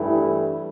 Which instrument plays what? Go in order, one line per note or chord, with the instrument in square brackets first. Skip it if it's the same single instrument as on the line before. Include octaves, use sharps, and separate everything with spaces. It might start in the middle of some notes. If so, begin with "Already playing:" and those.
Already playing: [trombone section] G2 E3 A3 E4